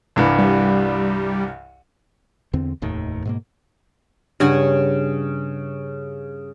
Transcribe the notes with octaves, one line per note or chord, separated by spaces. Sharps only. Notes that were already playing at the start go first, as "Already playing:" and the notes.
C2 G2 E3
G3
E2 D3 C4
F1 D#2 A2 D#3
G#2 B2 A#3
G2 C#3 F#5 G#5